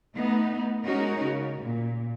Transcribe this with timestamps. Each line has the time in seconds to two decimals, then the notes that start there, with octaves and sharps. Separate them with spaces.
0.15 A3 B3 D#4
0.84 G#3 C#4 D#4 F#4 A#4
1.25 C#3
1.61 A#2